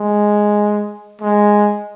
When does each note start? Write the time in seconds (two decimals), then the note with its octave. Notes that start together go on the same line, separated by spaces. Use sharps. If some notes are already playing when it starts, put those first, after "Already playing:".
Already playing: G#3
1.21 G#3